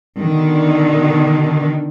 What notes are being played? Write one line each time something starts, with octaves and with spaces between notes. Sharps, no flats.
B2 D3 D#3